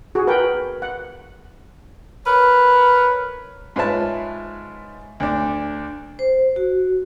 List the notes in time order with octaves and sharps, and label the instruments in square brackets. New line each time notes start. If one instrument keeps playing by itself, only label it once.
[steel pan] F#4 G#4
A#4 B4 F#5 G5
F#5
[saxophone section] A#4 B4 C#5
[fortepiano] G#2 F4 B4 C#5 E5 A5
D2 D4
[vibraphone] C5
F#4